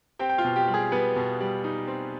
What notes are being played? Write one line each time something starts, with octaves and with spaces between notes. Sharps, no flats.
C4 G4 G5
G5
F4 F5
B2
G4
G3
G#4
G3 B3 B4
B2
G3
D#4
C4